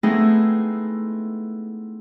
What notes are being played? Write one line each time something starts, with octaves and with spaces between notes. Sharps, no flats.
A3 B3 C4 D#4 E4 G#4